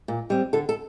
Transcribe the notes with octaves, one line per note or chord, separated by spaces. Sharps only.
A#2
G3 C4
D3 A4
A4